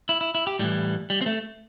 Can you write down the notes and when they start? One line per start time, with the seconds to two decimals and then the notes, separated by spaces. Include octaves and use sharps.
0.09 E4
0.21 E4
0.35 E4
0.47 G4
0.59 A2 E3 G3
1.10 G3
1.21 C4
1.26 A3